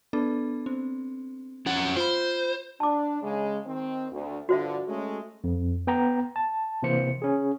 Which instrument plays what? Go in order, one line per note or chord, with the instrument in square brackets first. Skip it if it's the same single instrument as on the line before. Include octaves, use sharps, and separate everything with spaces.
[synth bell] B3 D4 A4
C4
[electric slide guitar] F2 C#4 F#5
[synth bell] F4 B5 [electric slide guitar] C5
[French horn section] D4 [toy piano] A5 D6
[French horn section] C#3 G#3
D#3 C4
D2
[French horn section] G2 D3 F3 [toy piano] F#4 C5 E5
[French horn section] G#3 A3 C#4
[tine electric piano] F2
B3 G5 A#5
A5
C3 E3 A#3 C5 C#7
C#4 G#4